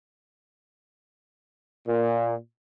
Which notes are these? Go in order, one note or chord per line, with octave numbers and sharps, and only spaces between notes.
A#2